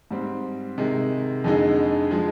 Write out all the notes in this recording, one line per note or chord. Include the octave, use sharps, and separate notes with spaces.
G#2 G3 C4
C3 D#3 G#3
F2 D3 G#3 D#4 G#4
F3 G#3 D#4 G#4